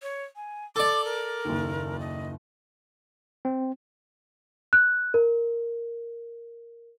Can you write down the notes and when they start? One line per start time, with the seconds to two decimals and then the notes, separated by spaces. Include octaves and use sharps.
0.02 C#5
0.36 G#5
0.76 A4 D5 D6
1.05 A#4
1.45 F#1 D#2
2.00 D#5
3.45 C4
4.73 F#6
5.14 A#4